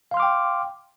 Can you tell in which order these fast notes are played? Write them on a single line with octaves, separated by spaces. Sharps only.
F5 C6 F6 D6 G5